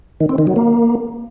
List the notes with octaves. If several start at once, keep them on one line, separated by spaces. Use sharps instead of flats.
D#3
C4
D#3
F#3
A#3